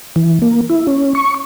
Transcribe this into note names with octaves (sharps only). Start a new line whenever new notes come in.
E3
A#3
E4
C#4
C#6